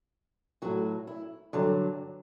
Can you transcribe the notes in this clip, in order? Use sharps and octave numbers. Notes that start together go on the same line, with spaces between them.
A2 F#3 F#4
E4
G2 D3 F#3